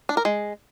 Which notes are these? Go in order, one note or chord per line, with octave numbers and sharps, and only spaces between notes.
D4
A#4
G#3